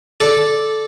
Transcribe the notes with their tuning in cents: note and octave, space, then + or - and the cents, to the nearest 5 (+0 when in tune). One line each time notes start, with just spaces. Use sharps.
A4 -10 D5 +0